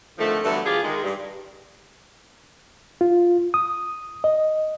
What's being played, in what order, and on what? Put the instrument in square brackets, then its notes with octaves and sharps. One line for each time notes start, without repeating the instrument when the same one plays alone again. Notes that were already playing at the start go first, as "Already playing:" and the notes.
[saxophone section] F2 D3 D#3 F3 A3
G2 D3 E3 F#3 A3 B3
D2 F4 G4 G#4
D#3 G#3
G2
[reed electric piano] F4
D#6
D#5